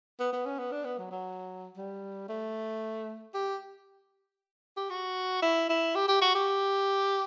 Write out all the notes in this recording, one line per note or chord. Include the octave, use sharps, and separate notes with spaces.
B3
B3
C#4
B3
D4
B3
F#3
F#3
G3
A3
G4
G4
F#4
E4
E4
G4
G4
F#4
G4